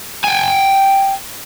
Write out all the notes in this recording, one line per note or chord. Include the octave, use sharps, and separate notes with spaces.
G5 G#5